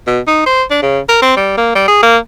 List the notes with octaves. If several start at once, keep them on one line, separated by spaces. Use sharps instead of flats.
B2
D#4
C5
D4
C#3
A#4
C4
G3
A#3
G3
G#4
A#3